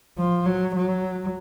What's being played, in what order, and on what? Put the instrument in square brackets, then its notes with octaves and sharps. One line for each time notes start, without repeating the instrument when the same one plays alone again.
[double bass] F3
F#3
F#3